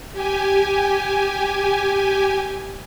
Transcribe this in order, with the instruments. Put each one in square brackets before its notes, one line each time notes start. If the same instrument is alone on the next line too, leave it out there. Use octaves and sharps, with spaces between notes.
[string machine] G4 G#5